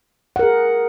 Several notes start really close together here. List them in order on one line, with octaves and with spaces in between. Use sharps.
F#5 A#4 G#4